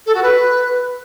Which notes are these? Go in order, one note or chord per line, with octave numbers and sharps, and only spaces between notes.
A4
F#4
B4